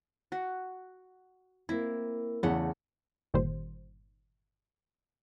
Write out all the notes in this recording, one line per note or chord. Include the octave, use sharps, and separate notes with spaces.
F#4
A#3 C4 E4
E2 C#3 A3 F#5
G1 A#2 D#3 G3 C5